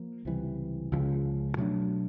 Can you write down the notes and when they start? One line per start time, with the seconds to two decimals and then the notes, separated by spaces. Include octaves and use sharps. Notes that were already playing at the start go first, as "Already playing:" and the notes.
Already playing: F3 A#3
0.25 C#2 C3 E3 G3
0.92 C#2 C#3 F3 G#3
1.57 B2 F#3 A3 D4